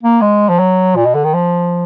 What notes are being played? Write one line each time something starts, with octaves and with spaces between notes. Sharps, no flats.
A#3
G#3
F3
F#3
A#2
B2
D3
D#3
F3